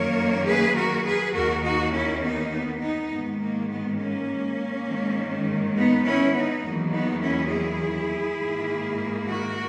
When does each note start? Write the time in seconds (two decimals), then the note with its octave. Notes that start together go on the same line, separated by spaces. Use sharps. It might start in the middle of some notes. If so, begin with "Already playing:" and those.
Already playing: F#2 D#3 A#3 A#4 C#5
0.46 G#4 B4
0.76 F#4 A#4
1.05 G#4 B4
1.34 D#2 D#3 A#3 F#4 A#4
1.64 D#4 F#4
1.93 C#4 E4
2.23 B3 D#4
2.53 B3
2.81 B3 D#4
3.11 G#2 D#3 G#3 B3
3.41 A#3
3.70 B3
3.99 A#3 C#4
4.87 G#2 D#3 G#3
5.76 B3 D#4
6.05 C#4 E4
6.34 B3 D#4
6.64 E2 D#3 F#3 A#3
6.93 B3 D#4
7.22 C#4 E4
7.52 E4 G#4
8.40 G#2 D#3 A#3
9.28 F#4 A#4